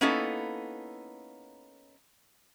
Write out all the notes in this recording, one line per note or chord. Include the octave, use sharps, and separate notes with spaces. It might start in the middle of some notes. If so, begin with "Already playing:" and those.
A#3 B3 C#4 D#4 E4 A4